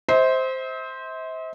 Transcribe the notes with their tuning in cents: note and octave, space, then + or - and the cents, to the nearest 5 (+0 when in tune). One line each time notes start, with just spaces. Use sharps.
C5 +0 E5 -45